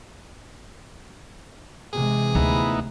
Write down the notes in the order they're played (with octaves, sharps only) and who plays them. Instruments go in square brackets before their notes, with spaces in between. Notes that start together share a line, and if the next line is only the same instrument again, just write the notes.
[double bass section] C3 E3 G#3 [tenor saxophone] G#4
[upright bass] D2 [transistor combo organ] B3 D#4 E4